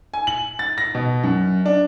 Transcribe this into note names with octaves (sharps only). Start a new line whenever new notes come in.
G#5
F#7
A6
A#6
B2
F#2
D4